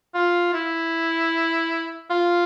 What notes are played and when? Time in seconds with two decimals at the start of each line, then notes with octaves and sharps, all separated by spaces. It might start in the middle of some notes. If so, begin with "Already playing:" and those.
0.15 F4
0.54 E4
2.10 F4